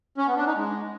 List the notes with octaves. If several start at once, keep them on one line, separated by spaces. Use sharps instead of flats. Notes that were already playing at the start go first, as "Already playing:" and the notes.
C#4
B3
D4
D#4
G#3